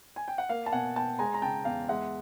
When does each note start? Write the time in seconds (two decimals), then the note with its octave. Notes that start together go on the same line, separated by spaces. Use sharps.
0.16 G#5
0.28 G5
0.38 F#5
0.49 A#3 F5
0.66 A5
0.72 B2 F#5 G#5
0.96 B2 G5 A5
1.19 G#3 G#5 A#5
1.34 A#5
1.42 C#3 G5 A5
1.65 E2 F5 G5
1.88 G#3 E5 F#5